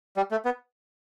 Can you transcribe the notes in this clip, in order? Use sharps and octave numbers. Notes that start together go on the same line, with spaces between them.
G3
A3
B3